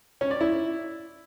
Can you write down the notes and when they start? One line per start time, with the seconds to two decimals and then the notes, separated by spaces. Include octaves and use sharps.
0.21 C#4
0.31 D5
0.41 E4